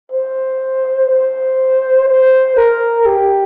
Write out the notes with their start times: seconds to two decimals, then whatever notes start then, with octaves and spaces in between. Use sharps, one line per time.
0.12 C5
1.10 C5
2.08 C5
2.57 A#4
3.06 G4